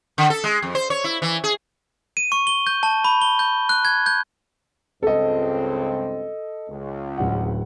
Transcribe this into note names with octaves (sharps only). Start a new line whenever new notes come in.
D3
A4
G#3
F2
C5
C#5
E4
E3
G#4
D#7
C#6
G7
G6
A5
B5
G7
G6
F#6
G#6
G6
C#2 G2 C4 A4 D#5
C#2
D1 F#5